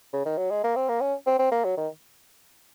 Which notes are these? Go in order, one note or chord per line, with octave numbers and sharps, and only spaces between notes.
C#3
D#3
F#3
G#3
A#3
C4
A#3
C#4
C4
C4
A#3
F#3
D#3